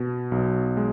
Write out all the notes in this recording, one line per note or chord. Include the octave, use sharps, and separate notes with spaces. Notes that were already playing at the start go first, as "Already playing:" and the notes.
Already playing: B2
B1
G#3